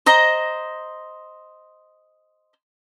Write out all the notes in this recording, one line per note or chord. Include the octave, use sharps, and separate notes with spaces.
C5 D#5 A#5